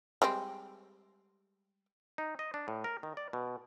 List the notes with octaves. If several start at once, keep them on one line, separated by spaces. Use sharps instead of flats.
G3 G#3 C4
D#4
D#5
D4
A2
A#4
D#3
D5
B2